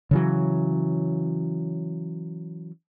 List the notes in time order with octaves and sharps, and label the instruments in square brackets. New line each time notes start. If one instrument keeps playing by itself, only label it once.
[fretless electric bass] C#3 E3 F#3